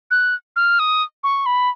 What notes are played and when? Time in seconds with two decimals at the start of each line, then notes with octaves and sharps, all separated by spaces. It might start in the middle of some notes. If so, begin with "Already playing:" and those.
0.11 F#6
0.56 F6
0.79 D#6
1.24 C#6
1.46 B5